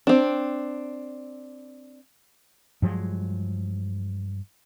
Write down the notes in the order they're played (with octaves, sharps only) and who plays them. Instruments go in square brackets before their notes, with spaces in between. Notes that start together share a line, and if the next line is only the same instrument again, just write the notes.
[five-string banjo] C4 D4
[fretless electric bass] G2 F3 F#3 G#3